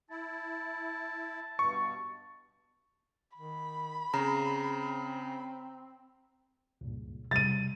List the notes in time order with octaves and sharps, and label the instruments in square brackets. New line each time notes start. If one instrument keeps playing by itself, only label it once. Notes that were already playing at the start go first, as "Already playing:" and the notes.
[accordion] E4 [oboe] A5
[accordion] G2 B2 [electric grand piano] C#6
[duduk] D#3 [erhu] B5
[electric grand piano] C#3 [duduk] C4 [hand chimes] A#5
[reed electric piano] C#2 G2 A#2
[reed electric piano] C3 G3 [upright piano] A6 D#7